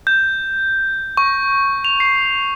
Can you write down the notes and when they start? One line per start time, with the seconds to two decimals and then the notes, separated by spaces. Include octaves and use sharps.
0.07 G6
1.17 C#6
1.85 F7
2.00 C7